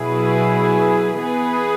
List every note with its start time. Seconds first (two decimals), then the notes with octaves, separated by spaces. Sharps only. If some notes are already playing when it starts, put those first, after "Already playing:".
Already playing: B2 F#3 E4 G#4 B4
1.18 E3 B3 G#4 B4